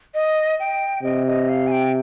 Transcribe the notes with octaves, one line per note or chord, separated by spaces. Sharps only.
D#5
G5
C3 D#5
D#5
F5
G#5
G5